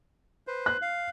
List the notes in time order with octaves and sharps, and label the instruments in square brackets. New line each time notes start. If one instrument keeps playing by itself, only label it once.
[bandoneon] B4 C5
[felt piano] F#6
[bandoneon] F5